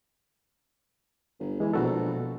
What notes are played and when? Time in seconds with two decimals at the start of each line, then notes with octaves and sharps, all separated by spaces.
1.39 G1
1.60 E3 G#3
1.74 A#1 B2 F#4 A4